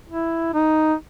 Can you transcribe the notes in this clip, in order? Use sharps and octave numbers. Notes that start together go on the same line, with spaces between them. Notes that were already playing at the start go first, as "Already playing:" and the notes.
E4
D#4